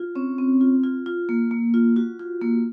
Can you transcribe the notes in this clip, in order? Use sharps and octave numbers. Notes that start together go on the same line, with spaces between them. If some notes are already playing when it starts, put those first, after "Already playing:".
Already playing: F4
C4 C#4 C#5
C4
F4
F4
F4
A#3
A#3
F4
F4 F#4
F4
A#3